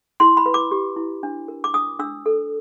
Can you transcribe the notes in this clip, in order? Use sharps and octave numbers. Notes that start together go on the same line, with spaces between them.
E4 C6
B5
B4
D6
G4
E4
D4
A#4
D6
D4 D#6
D4 E6
A4